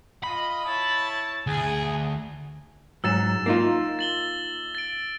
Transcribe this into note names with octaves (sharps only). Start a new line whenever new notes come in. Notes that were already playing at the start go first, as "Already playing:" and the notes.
F4 D#5 B5
E4 C#5 A5
D2 G#4
G#2 F#3 E6 A6 E7
A#3 D#4 F4
A6 F#7 G7
A6 D7